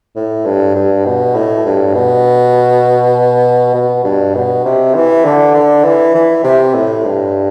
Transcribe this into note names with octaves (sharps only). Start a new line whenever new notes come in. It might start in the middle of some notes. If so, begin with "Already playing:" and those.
A2
G2
G2
B2
A2
G2
B2
B2
G2
B2
C3
E3
D3
D3
E3
E3
C3
A2
G2